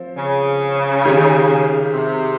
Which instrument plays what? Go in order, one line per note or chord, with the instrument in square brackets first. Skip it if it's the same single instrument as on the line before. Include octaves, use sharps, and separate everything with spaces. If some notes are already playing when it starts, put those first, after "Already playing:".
Already playing: [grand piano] F3 C4
[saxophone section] C#3
[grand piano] D#3 G#3 D#4 G4
[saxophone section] C3